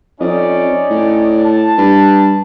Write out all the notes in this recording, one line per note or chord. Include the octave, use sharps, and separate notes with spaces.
F2 C#4 D#4 D5
A2
A5
G2